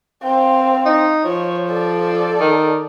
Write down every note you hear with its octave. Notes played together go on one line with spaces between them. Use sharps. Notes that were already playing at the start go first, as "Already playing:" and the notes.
C4 F5
D#4
F3 C#5
A4 D5
D#3